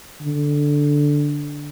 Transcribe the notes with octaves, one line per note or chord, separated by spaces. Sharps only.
D3